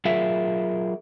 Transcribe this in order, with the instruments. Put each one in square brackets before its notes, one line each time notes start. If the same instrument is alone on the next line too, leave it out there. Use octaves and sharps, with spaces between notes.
[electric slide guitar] F#3 F4 G#4 A#4 E5